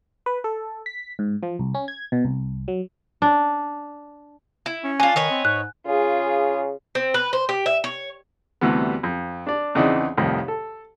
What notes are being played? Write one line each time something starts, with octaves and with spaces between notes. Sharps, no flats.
B4
A4
B6
G#2
F3
C2
C#4
G#6
B2
C2
F#3
D4
E4
C#4
D4 F4 G#5
D#3 B4 C#5 D#5
C4
G#2 F#6
C#3 F4 G#4
C4
B4
C5
G4
E5
C#5
D2 C3 E3 G3 B3
F2
D4 D5
E2 C#3 E3 C4 D#4 D5
C2 F2 A2 D#3
A4